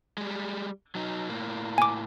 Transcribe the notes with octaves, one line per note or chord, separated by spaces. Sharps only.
G3 G#3
F#3 D#4
A2 A#3
G#5 D6